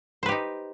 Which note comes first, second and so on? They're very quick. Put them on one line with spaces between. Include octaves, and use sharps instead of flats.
C5 B4 G4 D#4